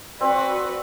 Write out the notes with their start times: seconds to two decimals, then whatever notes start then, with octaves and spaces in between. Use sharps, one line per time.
0.21 C4 F#4 B4 D5